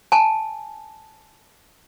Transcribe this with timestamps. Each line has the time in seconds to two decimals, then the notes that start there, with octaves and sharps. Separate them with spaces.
0.12 G#5 A5